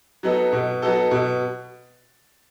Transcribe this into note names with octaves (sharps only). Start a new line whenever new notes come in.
F#3 B3 D#4 A4
B2
F#3 B3 D#4 A4
B2